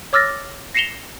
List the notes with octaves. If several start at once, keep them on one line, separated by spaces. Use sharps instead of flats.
C#5 D6 E6 F6 A6 A#6
A#6 C7 C#7 E7 F7 G7